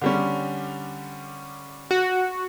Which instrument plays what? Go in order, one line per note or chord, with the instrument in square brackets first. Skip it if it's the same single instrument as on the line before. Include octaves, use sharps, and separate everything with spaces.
[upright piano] D3 G3 C#4
[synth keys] F#4